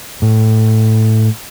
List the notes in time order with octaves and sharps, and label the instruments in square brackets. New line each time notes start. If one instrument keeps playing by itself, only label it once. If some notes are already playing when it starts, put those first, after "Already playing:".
[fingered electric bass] A2